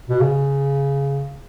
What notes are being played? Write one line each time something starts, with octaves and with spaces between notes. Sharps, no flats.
B2
C#3